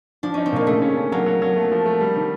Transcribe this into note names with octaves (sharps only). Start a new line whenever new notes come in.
F3 D4
C#4 D#4
C4
A#2 A#3
C#3 A3
C#4
C#4
F#3 A#3
F#3
F#3
A3
F3
A3
G3
D#3